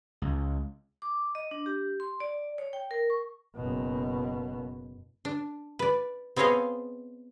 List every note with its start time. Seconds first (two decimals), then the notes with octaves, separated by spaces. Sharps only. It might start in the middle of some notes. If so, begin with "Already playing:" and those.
0.22 C#2
1.02 D6
1.35 D#5
1.51 D4
1.66 G4
2.00 C6
2.20 D5
2.58 C#5
2.73 G5
2.91 A#4
3.10 C#6
3.55 F#1 B2
5.25 D4
5.79 B4 D5
6.36 B3 C4 G#4 C#5 D#5 F5